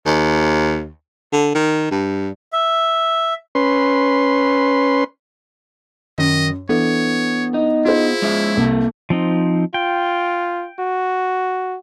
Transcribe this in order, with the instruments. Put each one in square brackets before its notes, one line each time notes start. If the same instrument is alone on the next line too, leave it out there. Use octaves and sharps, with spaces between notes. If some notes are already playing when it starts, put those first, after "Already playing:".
[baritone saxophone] D#2
D3
D#3
G2
[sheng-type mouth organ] E5
[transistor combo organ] C#4 B4 C6
[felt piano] F#2 [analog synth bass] D#3 [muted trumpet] D#5
[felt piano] E3 D4 A4 [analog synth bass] B3 [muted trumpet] C#5
[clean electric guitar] D#4
[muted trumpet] E4 [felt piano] F4 G#4 C5
[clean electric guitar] G#3 C#4 E5
[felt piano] C2 [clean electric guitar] A#3 A4
[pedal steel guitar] F3 C4 D#4
[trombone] F4 [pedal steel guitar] G5
[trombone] F#4